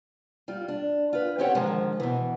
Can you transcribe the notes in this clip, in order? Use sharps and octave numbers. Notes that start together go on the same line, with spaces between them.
G3 F4
D4
F4 B4
C4 C#4 G4 C5 C#5 F#5
G#2 D3 D#3 F3 G#3
B2 E3